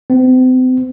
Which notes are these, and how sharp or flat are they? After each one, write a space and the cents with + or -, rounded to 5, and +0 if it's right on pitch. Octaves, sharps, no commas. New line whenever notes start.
C4 -40